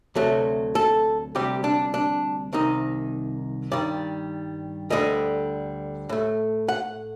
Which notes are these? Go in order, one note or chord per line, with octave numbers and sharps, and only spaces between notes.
D2 C3 F#3 A3
A4
D2 C3 G3 G4
D4
D4
C2 C3 D#3 D#4
G2 D#3 G3 D5
D2 D3 G3 D#5
A2 A3
F#5